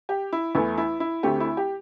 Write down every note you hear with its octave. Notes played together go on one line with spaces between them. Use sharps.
G4
E4
E2 E3 A3 E4
E4
E4
D2 D3 A3 C4 G4
E4
G4